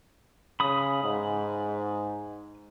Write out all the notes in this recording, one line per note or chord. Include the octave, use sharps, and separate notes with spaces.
C#3 B5 D#6
G#2